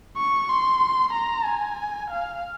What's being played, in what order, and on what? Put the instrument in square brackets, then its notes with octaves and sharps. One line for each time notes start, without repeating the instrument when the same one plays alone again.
[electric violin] C#6
C6
A#5
G#5
F5